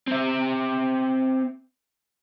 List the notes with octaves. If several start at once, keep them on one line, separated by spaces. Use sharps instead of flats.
C4 E5